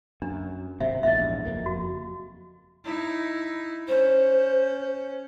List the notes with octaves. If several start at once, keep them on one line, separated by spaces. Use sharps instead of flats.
F#2 D4
G#1 F#2 C3 E5
A#1 E2 G#2 D#5 E5
F#1 F2 A#3
F#4
D#4 E4
C#4 C5